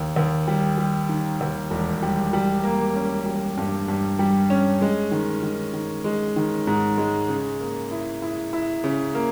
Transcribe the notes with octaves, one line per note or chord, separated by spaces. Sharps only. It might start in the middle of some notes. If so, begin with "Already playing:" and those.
Already playing: D#2
D#2
G3
G3
D#3
D#2
E1
G3
G3
A#3
C#4
G3
G2
G2
G3
C#4
G#3
D#3
D#3
D#3
G#3
D#3
G#2
G#3
C#3
A#3
E4
E4
E4
C#3
A#3